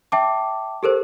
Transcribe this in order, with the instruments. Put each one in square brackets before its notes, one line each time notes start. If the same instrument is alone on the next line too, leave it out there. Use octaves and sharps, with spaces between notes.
[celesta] E5 G5 A5 D6
G4 A4 A#4 C5